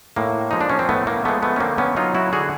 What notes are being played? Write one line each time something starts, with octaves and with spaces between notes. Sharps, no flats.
A2 A#3
F3 G#3 D#4
D4
C#4
C4
A2 A3 B3
A#3
F3 G#3 A3 B3
A3 B3
C#4
D3 A#3 C4
B3 C#4
F#3 D#4 F4
E4 F#4
D3 F#4 G#4